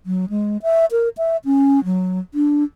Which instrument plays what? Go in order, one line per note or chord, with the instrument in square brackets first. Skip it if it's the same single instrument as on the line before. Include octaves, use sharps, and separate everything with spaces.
[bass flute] F#3
G#3
E5
A#4
E5
C#4
F#3
D4